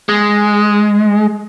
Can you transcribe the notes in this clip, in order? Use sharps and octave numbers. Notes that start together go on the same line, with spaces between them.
G#3